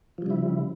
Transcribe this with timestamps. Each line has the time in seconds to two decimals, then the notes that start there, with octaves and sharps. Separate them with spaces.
0.18 F3
0.22 G3
0.26 C#3
0.30 E4